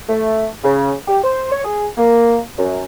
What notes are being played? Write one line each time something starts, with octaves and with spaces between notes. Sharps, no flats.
A3
C#3
G4
C5
C#5
G#4
A#3
F#2